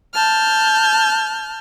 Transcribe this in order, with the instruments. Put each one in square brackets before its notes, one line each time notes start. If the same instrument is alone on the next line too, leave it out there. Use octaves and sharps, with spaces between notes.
[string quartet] A5 F6 G6